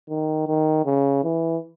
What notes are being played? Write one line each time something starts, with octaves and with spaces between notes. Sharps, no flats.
D#3
D#3
C#3
E3